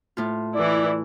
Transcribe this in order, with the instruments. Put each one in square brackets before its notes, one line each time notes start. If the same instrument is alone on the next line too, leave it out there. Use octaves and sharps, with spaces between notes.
[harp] A2 F4
[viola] E3 E4 [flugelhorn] D5